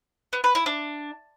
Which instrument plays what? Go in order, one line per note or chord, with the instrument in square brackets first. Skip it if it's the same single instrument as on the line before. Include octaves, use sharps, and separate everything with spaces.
[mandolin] B3
B4
E4
D4